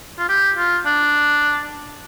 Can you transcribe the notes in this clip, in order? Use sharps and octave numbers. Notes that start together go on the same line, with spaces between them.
F4
G4
F4
D4